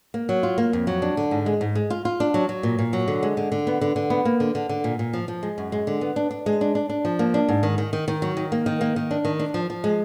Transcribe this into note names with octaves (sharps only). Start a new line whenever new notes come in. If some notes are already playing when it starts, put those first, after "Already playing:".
A#3
F#3
F4
A#3
F2
F#3
D4
D3
G#2
G#3
G#2
G#3
F4
F4
D4
F#3
F#3
A#2
A#2
F#3
D3
G#3
D3
D3
B3
D3
D3
B3
A#3
D3
D3
D3
A#2
A#2
F3
F3
G#3
F#2
G#3
D3
B3
D4
D4
G#3
D4
D4
D4
F3
A#3
D4
G#2
D#3
D#3
D#3
D#3
F#3
D#3
A#3
D#3
A#3
D#3
D4
D#3
D4
F3
F3
G#3